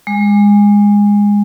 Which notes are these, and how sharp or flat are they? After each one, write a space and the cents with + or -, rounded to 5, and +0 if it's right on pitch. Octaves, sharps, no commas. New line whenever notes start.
G#3 -20